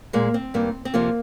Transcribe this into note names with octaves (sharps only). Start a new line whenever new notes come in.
A#2 G#3 A#3
C4
G2 D#3 A#3
C4
F2 C3 F3 A#3